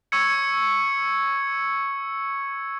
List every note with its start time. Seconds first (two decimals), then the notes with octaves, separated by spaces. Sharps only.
0.12 C#6 E6 G#6 C#7